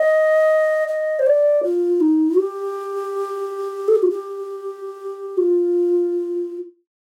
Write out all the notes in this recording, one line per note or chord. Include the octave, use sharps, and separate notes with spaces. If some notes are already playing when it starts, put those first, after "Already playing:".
Already playing: D#5
D#5
C5
D5
F4
D#4
G4
A4
G4
F4
G4
F4